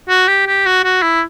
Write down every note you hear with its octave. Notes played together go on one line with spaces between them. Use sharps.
F#4
G4
G4
F#4
F#4
E4